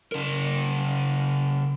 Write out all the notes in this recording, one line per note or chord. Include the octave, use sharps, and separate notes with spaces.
C#3 A#4